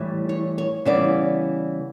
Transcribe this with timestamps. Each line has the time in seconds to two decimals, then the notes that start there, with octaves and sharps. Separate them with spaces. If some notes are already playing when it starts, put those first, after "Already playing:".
Already playing: A2 E3 G3
0.29 C#5
0.58 C#5
0.85 C#3 E3 G3 B3 D5